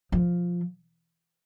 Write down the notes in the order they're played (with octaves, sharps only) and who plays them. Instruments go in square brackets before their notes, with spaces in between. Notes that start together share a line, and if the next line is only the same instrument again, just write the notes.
[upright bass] F3